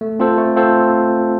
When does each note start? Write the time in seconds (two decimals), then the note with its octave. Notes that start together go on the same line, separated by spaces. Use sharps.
0.01 A3
0.20 C4 F4 A4 C5
0.38 A3
0.56 C4 F4 A4 C5